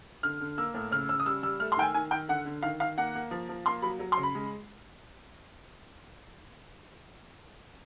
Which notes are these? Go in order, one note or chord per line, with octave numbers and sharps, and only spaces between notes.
D3 F6
D3
A#3 E6
A2
C#3 F6
C#3 E6
D#6
G3 E6
G3 E6
A3 F6
C6
D#3 G5
G#5
D#3 G#5
D#3 G5
D3 F#5
D3
D#3 F5
D#3 F5
A#3 F#5
A#3
F3
F3
A#3 C6
F#3 B5
F#3
C6
C#3
B5
G#3